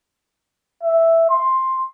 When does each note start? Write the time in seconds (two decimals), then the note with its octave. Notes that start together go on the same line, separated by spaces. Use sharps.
0.83 E5
1.30 C6